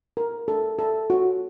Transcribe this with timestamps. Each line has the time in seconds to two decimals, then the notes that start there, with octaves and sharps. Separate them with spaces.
0.17 A#4
0.48 A4
0.79 A4
1.10 F#4